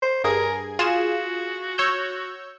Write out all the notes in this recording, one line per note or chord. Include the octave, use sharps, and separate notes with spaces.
C5
G2 G#4 A#4 G#6
F4 F#4 G#4 E7
C#5 E6 G6